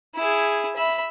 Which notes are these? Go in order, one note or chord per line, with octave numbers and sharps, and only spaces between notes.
E4 G#4
E5 B5